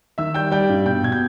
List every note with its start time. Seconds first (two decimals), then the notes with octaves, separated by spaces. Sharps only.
0.18 D#3 E5 E6
0.34 G3 G5 G6
0.52 G3 G5 G6
0.69 G2
0.86 B2 G5 G6
1.03 B2 G#6
1.12 G6